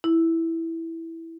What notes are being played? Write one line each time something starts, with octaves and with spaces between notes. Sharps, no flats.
E4